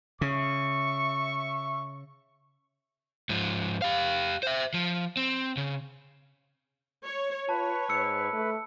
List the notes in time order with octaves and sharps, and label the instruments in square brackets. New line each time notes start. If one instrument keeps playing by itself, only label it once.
[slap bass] C#3 [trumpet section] E5 C#6
[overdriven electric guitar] G#2 F3
G4 F5
C5 E5
F3
C4
C#3
[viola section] C#5
[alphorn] F4 [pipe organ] B4 [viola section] C#5 [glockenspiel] A5
[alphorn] G#2 [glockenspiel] E6 C#7
[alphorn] A3